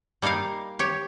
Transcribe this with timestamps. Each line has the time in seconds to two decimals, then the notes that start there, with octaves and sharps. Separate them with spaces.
0.22 G3 A#3 D#4 A#4 F5
0.79 G4 C#5